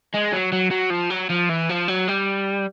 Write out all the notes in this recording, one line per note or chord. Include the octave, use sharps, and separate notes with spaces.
G#3
F#3
F#3
F#3
F3
F#3
F3
E3
F3
F#3
G3